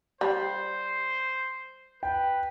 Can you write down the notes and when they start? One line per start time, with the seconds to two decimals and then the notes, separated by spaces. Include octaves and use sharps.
0.21 G3 C5
2.03 B4 G5